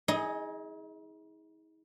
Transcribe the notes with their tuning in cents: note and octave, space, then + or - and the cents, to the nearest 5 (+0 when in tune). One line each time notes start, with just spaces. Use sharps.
D#4 +45 G#4 +0 D#5 +0